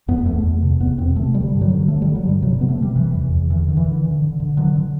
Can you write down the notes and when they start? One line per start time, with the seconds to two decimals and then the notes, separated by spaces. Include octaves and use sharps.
0.08 E2 B3
0.26 E2 A3
0.44 E2
0.62 C3
0.80 E2 B3
0.98 C3 C4
1.16 C3 A3
1.34 D3 G3
1.52 G2
1.61 F#3
1.70 D3
1.88 D3 A3
2.02 G3
2.06 D3
2.15 F#3
2.24 G2 G3
2.42 C3 F#3
2.60 C3 B3
2.68 A3
2.78 C3 G3
2.96 C3 E3
3.14 E2
3.32 E2
3.50 D3 E3
3.68 D3
3.77 E3
3.86 D3
4.04 D3
4.22 D3
4.40 D3
4.57 D3 F#3
4.76 D3